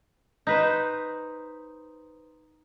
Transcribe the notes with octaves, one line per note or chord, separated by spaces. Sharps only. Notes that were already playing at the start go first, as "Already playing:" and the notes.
D#4 B4 C5